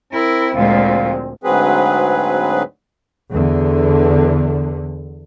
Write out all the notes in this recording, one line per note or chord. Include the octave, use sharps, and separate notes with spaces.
C4 E4 A#4
D2 A#2 F3 G#3 F5
D2 G#2 F#3 C4 G#4 B4
E2 D3